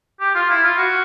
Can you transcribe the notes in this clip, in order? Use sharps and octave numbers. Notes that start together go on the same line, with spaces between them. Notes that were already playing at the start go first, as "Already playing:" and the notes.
G4
F4
E4
F4
F#4